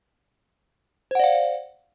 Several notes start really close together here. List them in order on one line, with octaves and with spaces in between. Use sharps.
C5 F#5 D5 F5